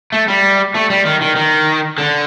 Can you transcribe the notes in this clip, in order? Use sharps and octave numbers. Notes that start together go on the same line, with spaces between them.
A3
G3
A3
G3
D#3
D#3
D#3
D3